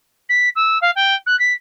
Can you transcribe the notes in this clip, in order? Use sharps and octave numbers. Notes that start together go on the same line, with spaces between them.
B6
E6
F5
G5
F#6
B6